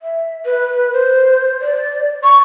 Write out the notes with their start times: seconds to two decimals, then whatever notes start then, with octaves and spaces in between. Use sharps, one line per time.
0.02 E5
0.46 B4
0.93 C5
1.62 D5
2.24 C#6